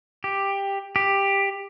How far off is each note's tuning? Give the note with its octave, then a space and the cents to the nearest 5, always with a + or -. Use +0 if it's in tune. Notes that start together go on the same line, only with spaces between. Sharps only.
G4 +10
G4 +10